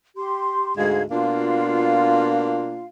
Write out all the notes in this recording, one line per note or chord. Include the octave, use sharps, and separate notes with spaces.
G4 C6
D2 G#2 G#3 F5 G#6
B2 A#3 D4 F4 F5